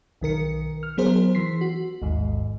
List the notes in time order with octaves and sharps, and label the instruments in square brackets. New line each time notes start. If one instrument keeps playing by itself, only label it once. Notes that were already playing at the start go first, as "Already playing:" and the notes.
[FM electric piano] B1 D#3 A#4 C#7
F6
F#3 B3 G#4 A#4 C5
E3 C6 B6 C7
F#4
A1 D#2 G#2